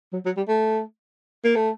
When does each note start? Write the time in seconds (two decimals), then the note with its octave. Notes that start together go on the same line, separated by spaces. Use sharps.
0.13 F#3
0.25 F#3
0.37 G3
0.48 A3
1.44 A#3
1.55 A3